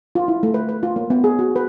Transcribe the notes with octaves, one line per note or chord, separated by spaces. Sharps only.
F4
E4
A3
B4
B4
F4
A#3
B3
G#4
F#4
B4